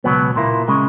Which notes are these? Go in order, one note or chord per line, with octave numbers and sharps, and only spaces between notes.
C#2 B2 F#3 B3
A#2 A#3 E4
C#3 G#3